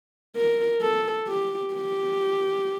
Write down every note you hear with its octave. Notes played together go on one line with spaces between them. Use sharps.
A#4
A4
G4
G4